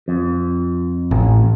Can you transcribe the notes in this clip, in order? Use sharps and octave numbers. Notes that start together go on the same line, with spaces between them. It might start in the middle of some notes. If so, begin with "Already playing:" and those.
F2
A1